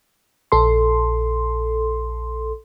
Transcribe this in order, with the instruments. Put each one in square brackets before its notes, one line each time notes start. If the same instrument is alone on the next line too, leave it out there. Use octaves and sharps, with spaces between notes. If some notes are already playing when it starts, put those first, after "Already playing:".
[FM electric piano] A#1 A4 C6